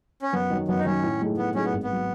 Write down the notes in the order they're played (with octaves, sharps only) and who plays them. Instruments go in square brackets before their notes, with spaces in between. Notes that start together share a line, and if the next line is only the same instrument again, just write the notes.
[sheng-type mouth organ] C#4
[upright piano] F#2 [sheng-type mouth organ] B3
[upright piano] D#3 F#3
[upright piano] F#2 [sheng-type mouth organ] B3
[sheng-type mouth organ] D#4
[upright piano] D#3 F#3 [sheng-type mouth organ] C#4
[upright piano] A2
F#3 A3 D#4 G#4
[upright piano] A2 [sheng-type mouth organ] B3
[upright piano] F#3 A3 D#4 G#4 [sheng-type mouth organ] C#4
[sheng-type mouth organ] B3
[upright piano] G#1
[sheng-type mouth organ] B3
[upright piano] F#3